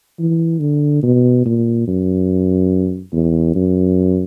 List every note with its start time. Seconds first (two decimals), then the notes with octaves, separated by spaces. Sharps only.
0.19 E3
0.60 D3
1.03 B2
1.45 A#2
1.87 F#2
3.13 E2
3.55 F#2